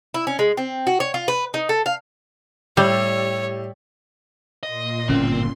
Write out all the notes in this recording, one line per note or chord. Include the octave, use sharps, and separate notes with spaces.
E4
C#4
G#3
C4
F#4
C#5
F4
B4
D#4
A4
F5
A2 G3 G4 C#5 D5 E6
A#2 D#5 C6
G1 A2 C#3 C4 C#4 E5